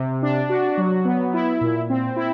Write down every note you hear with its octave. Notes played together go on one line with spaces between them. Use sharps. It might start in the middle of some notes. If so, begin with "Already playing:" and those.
Already playing: C3
D4
F#4
F#3
B3
E4
A#2
C4
E4